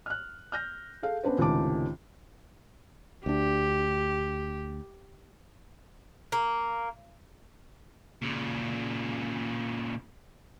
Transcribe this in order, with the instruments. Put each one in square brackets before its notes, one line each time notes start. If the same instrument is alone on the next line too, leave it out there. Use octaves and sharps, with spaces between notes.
[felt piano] F6 F#6
F6 G6 A#6
G#4 A4 F5
B3 C#4 D4 B4 C5
C#2 A2 C3 D#3 A5 D6
[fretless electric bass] D2 D4 [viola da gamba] G4
[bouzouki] A#3
[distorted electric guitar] A#2 C#3